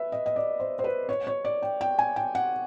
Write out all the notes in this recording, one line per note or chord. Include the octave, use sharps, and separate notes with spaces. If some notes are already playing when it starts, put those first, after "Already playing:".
Already playing: B4 E5
D#5
D#5
D5
C5
C5
B4
C#5
C#5
D5
G5
G5
G#5
G5
F#5